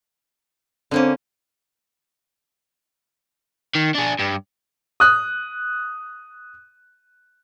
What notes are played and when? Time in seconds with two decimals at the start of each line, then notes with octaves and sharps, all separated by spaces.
0.91 D3 A#3 C4 C#4 C5
3.75 D#3
3.95 D4 G#4
4.19 G2
5.00 D#6 F#6